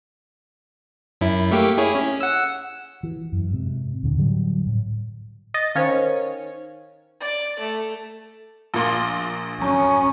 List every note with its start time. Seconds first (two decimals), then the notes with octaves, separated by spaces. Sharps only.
1.21 F#2 E4
1.51 A3 A#3 G4
1.78 E4 G#4 C#5
1.95 C#4
2.21 F#5 E6
3.03 E3
3.32 F#2
3.51 G#2 C3
4.03 D#2 A#2 D3
4.17 A2 D3 F#3 G3
4.66 A2
5.54 D#5 A6
5.75 D#3 C#4 C5 C#5 F5
7.20 D5
7.59 A3
8.74 A#1 A#3 C6
9.62 F#2 C#4